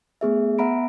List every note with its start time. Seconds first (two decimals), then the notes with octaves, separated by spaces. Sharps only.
0.21 A3 B3 G#4 E5
0.58 B3 E5 F#5 A#5 B5 D7